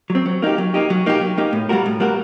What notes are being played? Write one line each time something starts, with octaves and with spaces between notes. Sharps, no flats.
F#3
C4
F#3
A#3 D#4 G4
F#3
A#3 D#4 G4
F#3
A#3 D#4 G4
F#3
A#3 D#4 G4
A2
G3 A#3 F#4 A#4
A2
G3 A#3 F#4 A#4